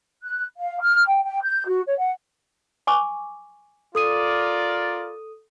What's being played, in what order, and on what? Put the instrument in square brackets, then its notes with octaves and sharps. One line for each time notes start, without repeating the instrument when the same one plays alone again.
[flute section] F#6
F5
F6
G5
G5
G6
F#4
C#5
F#5
[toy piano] G#5 C#6 D6
[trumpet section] F4 A#4 D5 [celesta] A4 D#6 D#7